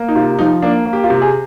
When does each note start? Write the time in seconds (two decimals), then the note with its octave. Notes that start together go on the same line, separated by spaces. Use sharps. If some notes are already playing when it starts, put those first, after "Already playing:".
Already playing: A#3
0.09 D#4
0.15 C3 F4
0.39 F3 D#4
0.62 A#3 D4
0.86 A#3
0.93 G4
1.04 F4
1.10 C3
1.22 G#4